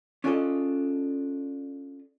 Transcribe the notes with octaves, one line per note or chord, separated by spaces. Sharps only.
C#4 D4 F4 G#4 A4 D#5